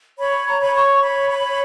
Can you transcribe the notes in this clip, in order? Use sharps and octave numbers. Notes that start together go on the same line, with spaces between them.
C#5 B5
A#5
C#5 B5
C#6
C#5 B5
B5
C#5